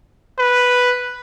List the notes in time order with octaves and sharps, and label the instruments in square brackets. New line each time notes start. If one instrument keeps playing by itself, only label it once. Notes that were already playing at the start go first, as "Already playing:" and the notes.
[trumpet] B4